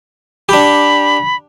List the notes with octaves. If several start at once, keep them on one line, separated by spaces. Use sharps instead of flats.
D4 G4 B5